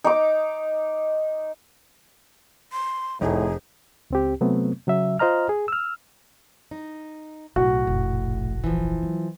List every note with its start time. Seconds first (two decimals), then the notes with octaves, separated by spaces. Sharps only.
0.04 D#4 D6
2.72 C6
3.21 F1 A2 D#4 G#4 G#5
4.10 C#2 C4 G4
4.41 C3 F#3 A3 B3 C4
4.87 C#3 F#3 E5
5.19 F4 C5 D#5 A#5 F6
5.49 G#4
5.68 E6 F6
6.71 D#4
7.56 B1 A2 A3 F#4
7.87 F1 A#1
8.64 E3 F3
9.03 F#3